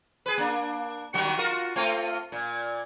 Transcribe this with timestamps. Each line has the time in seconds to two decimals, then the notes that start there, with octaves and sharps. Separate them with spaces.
0.26 G#4 B4
0.38 A#3 D4
1.14 D#3 F#3 F#4
1.38 F4 F#4 A#4
1.76 A3 C4 F4
2.32 A#2